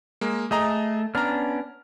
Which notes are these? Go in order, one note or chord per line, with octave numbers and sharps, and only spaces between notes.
G#3 A#3
A3 G#4 D#5 A#5
B3 C#4 D4 A#5 F6